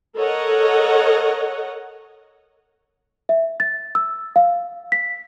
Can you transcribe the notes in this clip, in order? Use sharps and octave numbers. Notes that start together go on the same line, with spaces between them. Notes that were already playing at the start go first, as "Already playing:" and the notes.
A4 A#4 C#5 D#5 F#5
E5
A6
E6
F5
B6